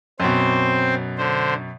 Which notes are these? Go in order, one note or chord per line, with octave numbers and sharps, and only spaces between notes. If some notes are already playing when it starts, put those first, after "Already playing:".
F#2 B2 C4 C5
D3 C5